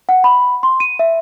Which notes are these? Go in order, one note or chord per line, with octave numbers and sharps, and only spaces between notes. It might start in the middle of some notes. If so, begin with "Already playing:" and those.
F#5
B5
C6
D#7
E5